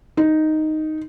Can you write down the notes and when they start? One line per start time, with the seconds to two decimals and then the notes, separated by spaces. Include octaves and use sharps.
0.17 D#4